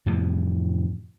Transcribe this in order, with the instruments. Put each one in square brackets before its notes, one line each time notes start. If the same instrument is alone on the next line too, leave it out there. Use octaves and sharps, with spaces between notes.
[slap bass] F2 A2 C3 E3